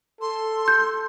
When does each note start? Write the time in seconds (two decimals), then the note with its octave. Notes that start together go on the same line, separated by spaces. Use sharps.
0.21 A4 C6
0.68 G6